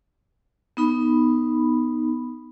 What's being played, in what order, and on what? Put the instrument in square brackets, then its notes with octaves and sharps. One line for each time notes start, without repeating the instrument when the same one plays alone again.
[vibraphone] B3 D#4 B5